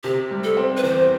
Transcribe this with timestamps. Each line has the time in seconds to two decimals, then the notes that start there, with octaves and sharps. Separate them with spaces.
0.04 C3 G4
0.31 G3
0.44 A4
0.57 C4
0.77 B4
0.83 E2 C5